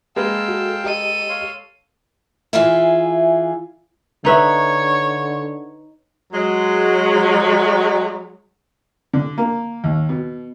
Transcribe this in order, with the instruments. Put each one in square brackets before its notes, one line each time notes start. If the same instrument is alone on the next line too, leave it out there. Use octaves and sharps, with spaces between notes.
[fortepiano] G#3 A#3 B4 [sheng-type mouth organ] F5 G5 A5 [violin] E6
[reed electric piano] F#4 A4
[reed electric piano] G4 D#5 [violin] A4 D#7
[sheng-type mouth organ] C#5 F5 C6
[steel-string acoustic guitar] E3 F4 G#4 E5
[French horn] D3 [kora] D#4 B4 E5 [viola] C#5
[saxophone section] F#3 G#3
[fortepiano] D3
A#3
D#2
B2